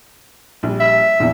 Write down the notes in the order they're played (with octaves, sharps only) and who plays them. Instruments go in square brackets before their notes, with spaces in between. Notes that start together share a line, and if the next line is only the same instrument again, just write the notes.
[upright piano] A#1 G3
[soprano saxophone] E5
[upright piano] A#1 E2